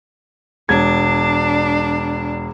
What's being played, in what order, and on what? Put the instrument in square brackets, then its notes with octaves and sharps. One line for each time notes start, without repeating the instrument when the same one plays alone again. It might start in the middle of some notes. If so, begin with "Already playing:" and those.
[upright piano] E1 G#6 [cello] D4